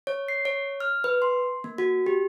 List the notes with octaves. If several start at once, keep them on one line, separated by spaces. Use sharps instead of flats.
C#5
C7
C#5
F6
B4
C6
A#3
F#4
G4